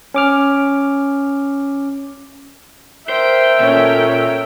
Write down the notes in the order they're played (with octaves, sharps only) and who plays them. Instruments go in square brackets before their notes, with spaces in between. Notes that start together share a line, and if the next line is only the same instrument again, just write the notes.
[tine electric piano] C#4 D6 F6
[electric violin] A#4 G5 [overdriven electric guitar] C5 [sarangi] E5
[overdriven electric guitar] A#2 [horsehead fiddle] C#4 A4